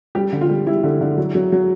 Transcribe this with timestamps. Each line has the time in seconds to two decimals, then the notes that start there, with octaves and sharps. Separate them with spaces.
0.15 G3 G4
0.33 D3
0.41 F4
0.49 G3
0.67 G3 E4
0.84 D3
1.01 D3
1.17 F#3
1.35 F#3
1.52 F#3